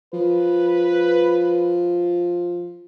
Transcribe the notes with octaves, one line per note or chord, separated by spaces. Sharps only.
F3 B4